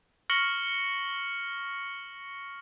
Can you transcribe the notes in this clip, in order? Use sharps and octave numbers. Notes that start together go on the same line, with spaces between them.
C#6 F6 A#6 C#7 F#7 G7